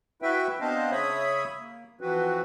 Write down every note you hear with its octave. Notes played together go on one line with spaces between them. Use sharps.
E4 F#4 B4 E5 G5
B3 C4 D4 C5 D#5 F5
C#3 C#5 E5 B5 D#6
A#3
E3 F3 C4 F#4 B4